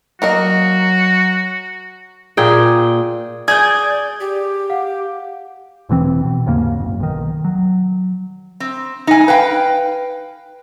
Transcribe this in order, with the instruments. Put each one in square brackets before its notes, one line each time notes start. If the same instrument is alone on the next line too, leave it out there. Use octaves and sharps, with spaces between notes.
[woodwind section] F#3 [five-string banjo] A#3 A#4 D#5 [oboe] F#4
[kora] A#2 G#4 G5
[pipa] G#4 [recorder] D5 [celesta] G#5 [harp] G6 G#6
[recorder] G4
[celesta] F5 F#5
[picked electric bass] E1 B2 E3 C4
B2
D#2 G#2 C#3 A#3
F#1
B1 D#3
F#3
[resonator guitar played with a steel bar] C4
D#4 G#5
B4 F5 G5